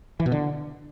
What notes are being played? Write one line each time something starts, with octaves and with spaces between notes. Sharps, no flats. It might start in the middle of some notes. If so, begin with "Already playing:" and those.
E3
B2
D3